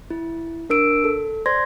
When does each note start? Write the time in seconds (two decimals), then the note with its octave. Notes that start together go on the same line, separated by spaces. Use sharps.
0.10 E4
0.70 D4 A#4 E6 D7
1.04 A4
1.46 C5 D5 C6 G#6 A#6